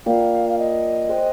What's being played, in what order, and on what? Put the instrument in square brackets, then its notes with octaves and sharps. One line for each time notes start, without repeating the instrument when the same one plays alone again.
[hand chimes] A#3 F4 A#4 D5 G5 [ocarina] F5
[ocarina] F5
D#5
[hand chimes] G#4 C5 G5